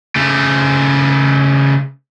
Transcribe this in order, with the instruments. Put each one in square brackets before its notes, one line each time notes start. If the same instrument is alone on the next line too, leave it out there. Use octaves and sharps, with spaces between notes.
[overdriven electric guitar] C#3 A3